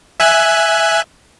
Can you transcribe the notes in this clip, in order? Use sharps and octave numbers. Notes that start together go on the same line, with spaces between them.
E5 G#5 F#6